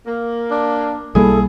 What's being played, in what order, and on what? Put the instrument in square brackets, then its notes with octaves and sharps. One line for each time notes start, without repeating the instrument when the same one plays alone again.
[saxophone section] A#3
[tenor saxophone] D4
[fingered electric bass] B1 G3 A#3 [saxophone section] E4 [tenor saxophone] G#4 [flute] A4